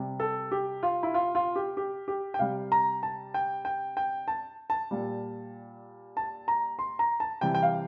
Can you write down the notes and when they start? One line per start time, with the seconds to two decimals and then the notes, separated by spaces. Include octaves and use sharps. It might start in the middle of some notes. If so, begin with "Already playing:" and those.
Already playing: C3 G3
0.20 A4
0.52 G4
0.83 F4
1.03 E4
1.14 F4
1.35 F4
1.56 G4
1.77 G4
2.08 G4
2.34 G5
2.39 C3 G3 F5
2.72 A#5
3.03 A5
3.34 G5
3.65 G5
3.97 G5
4.28 A5
4.70 A5
4.91 A#2 G3
6.17 A5
6.48 A#5
6.79 C6
6.99 A#5
7.20 A5
7.41 C3 E3 G3 G5
7.55 G5
7.63 F5